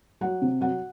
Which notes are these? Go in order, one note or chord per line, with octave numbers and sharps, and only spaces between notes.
F#3 F#5
C3
F#3 F#5